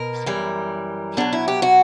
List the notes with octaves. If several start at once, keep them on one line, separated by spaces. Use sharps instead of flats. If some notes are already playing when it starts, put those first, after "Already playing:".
Already playing: B2 A#4
F#2 E3 G3
B2 F#3 D4
E4
G4
F#4